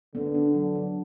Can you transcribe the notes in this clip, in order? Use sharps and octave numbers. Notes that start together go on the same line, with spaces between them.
D3 B3
D4
F#3
F#3